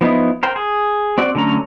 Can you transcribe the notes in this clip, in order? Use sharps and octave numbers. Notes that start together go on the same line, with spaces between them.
F3 B3 D#4 E4
A#4 C5 G5
G#4
C4 F#4 D5
D3 F#3 A3 C#4 A#5